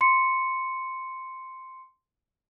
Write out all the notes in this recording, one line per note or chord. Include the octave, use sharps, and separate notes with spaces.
C6 C#7